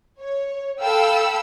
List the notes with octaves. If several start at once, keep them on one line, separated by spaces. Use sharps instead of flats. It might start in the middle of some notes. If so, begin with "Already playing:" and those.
C#5
A4 F5 G5 B5 E6